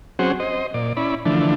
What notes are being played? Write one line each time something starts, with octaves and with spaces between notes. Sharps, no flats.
F#3 C4 C#4 F#4 G#4 C5
C5 D#5
A#2 D5
C#4 E4 D5 B5
D3 E3 F3 A3 D4